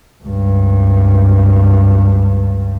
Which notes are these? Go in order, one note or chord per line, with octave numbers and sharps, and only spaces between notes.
C#2 G2